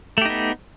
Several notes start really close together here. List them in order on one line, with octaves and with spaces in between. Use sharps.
A3 G4 D#4 B3